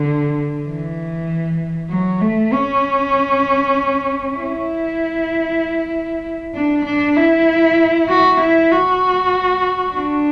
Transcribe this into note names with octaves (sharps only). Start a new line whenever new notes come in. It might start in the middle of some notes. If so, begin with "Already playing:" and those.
Already playing: D3
E3
F#3
A3
C#4
E4
D4
D4
E4
F#4
E4
F#4
D4